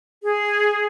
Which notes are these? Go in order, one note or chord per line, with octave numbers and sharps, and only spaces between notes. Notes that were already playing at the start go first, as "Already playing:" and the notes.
G#4